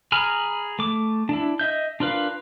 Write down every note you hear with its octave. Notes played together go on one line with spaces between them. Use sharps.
G#4 G#5 A#5 B5 F6
A3 D6
D4 E4
D#5 E5 G6
D4 F4 A#4 B4 F5